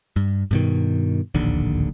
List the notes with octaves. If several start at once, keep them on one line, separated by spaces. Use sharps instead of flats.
G2
G2 B2 D#3
D1 A#1 D#2 D3